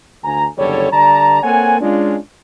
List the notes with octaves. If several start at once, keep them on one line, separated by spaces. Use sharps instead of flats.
D2 G#5 A#5
F#1 E2 D3 G3 A4 C#5
D3 G3 D5 A5 A#5
A#3 C4 A4 C#5 F#5 G#5
G#3 C#4 D4 F4